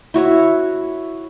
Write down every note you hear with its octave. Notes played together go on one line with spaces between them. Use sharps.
E4 F#4 C#5 C#6